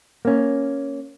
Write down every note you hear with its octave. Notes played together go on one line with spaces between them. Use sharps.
A#3 C#4